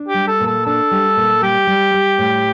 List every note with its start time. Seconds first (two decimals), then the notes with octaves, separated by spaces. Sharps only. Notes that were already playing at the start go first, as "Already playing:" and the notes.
Already playing: D4
0.08 G4
0.14 G3
0.28 A4
0.40 A#2
0.47 A4
0.66 D4 A4
0.91 G3
1.17 A#2
1.42 G3 G4
1.67 G3
1.94 G3
2.18 A2